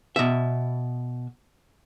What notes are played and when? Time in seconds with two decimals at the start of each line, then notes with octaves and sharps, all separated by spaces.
0.16 B2 E5